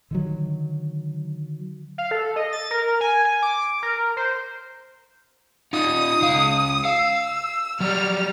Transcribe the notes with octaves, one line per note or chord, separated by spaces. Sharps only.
D3 D#3 F#3
F5
A4
D#5
A6
A#4
G#5
G#5
D6
A#4
C5
D#4 F4 D#6
C#2 F5
F5 E6
F#3 G3 F6